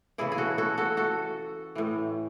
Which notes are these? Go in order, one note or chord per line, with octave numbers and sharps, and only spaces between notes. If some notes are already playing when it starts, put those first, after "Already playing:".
C#3 E3 E4 G#4
G#4
F#4 A4
F#4 A4
F#4 A4
F#4 A4
A2 E3